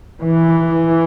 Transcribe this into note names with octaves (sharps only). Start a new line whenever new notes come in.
E3